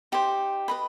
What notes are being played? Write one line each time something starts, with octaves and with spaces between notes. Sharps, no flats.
D#4 G4 C5
B4 D#5 B5